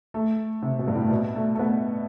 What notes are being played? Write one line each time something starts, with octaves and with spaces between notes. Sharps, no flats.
A3
C3
B2
G2
A2
B2
A3
A3
B3